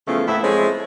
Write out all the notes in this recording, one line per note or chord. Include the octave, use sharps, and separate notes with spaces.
C#3 E3 F3 A3 B3
A2 A#3 B3 E4 E5
F3 G#3 A3 C4 E4 C#5